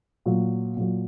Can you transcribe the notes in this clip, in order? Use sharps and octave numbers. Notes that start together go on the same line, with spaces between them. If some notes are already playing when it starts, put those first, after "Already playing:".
A#2 F#3
A#2 F#3